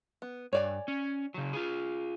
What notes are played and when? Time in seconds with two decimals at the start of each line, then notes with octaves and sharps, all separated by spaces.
0.22 B3
0.53 G2 C#5 D5 G#5
0.88 C#4
1.34 C#3 F#3
1.53 F4 G#4